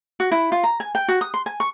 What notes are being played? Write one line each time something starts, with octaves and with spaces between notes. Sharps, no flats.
F#4
E4
F4
A#5
G#5
G5
F#4
D#6
C6
G#5
C#6